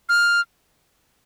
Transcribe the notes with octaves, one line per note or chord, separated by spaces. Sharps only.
F6